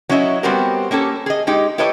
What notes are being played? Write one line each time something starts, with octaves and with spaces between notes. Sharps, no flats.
F#3 C#4 E4 D#5 E5
G3 B3 C4 F#4 G4 A#4
A#3 C#4 G4 A4
G#4 D#5
G#3 D#4 G4
E4 G4 A4 B4 C#5 D#5